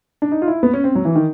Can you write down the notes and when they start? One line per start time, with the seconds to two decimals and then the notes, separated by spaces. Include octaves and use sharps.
0.22 D4
0.32 D#4
0.42 F4
0.48 E4
0.63 B3
0.73 C#4
0.84 C4
0.95 F#3
1.05 E3
1.16 D#3